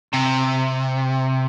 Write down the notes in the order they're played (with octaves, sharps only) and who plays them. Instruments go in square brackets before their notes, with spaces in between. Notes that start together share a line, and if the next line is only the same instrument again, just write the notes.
[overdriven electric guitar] C3